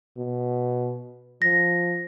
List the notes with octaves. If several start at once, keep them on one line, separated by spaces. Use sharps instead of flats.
B2
F3 A#6